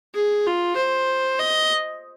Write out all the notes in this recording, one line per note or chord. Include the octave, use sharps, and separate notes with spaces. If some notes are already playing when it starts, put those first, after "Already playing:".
G#4
F4
C5
D#5